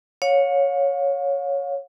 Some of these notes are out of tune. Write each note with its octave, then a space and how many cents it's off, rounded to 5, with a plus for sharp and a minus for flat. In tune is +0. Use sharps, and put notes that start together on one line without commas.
C#5 +0 F5 +35